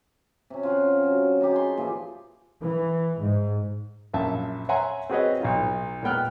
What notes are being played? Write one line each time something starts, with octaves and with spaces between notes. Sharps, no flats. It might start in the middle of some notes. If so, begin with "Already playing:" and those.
C3 C#4
F4 F5 F#5
F#3
D#4 F4 G4 G#4
C6
A#2 E3 F3
E3
G#2
A#1 F#2 E5 A5
C#5 E5 F#5 G#5 A#5 C6
C4 F#4 G#4 B4 C#5 D#5
B1 D#4 F4
A#2 G#3 B3 G5 F6 F#6